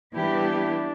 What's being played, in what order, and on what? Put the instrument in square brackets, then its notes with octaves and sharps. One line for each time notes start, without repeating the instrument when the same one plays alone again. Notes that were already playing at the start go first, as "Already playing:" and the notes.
[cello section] E3 G3 B3 E4 G4 [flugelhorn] D4